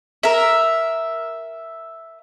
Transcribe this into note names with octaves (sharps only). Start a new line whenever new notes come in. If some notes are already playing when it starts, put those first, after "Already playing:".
A#4 E5